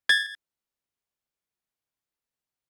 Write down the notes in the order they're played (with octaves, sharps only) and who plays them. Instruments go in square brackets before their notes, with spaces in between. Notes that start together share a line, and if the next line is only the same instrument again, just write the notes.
[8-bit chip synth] G#6 A6